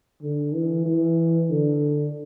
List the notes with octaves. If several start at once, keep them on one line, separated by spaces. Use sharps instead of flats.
D3
E3
E3
D3